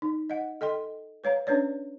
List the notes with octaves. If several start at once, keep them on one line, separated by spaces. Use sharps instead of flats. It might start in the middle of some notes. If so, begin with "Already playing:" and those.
D#4
D#5 F#5
A4 D#5 G5 C6
B4 C#5 F5 A#5
C#4 D4 B4 C#5 D5